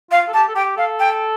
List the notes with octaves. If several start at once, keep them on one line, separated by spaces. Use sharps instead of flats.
F4 F5
A4
G4 A5
A4
G4 G5
A4 F5
G5